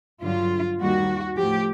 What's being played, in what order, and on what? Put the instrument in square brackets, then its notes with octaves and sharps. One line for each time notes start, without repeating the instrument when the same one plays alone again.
[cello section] G2 D3 F#3 F4
D#2 D#3 G3 F#4
A2 F3 G4